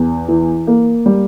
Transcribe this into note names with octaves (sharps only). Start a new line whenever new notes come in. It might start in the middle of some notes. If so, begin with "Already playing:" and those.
Already playing: E2
E3
A#3
G3